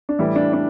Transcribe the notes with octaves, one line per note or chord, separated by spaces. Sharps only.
D4
A2 E3 G3 E4
D4
D4